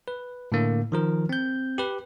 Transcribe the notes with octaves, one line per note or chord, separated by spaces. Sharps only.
B4
A2 D3 A#3
D#3 F3 A#4
C4 G6
G4 B4